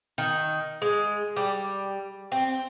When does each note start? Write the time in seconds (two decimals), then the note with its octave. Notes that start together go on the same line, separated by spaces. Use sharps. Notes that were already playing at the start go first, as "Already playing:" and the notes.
0.18 D#3
0.82 G#3
1.36 G3
2.32 C4